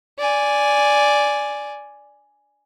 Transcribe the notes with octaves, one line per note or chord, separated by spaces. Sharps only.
D5 G#5